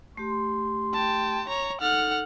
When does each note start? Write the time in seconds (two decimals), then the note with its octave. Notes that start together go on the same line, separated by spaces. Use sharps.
0.17 A3 G4 C6
0.94 G5 A5
1.49 C#5 A#5
1.81 D#4 A4 F#5 F6